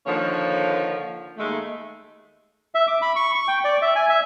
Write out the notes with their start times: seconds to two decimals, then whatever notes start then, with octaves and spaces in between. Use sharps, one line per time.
0.06 D3 D#3 F3 A#3 C#5
1.38 D#2 G#3 A3
2.75 E5
2.87 D6
3.02 B5
3.16 C#6
3.35 C#6
3.48 G5
3.64 D5
3.82 E5
3.96 G#5
4.09 E5